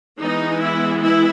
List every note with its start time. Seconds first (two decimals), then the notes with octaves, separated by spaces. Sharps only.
0.19 E3 G#3 B3 D#4
0.60 E4
1.01 E4